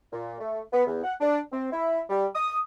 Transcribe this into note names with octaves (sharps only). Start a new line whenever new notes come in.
A#2
A3
B3
E2
F#5
D4
C4
E4
G3
D#6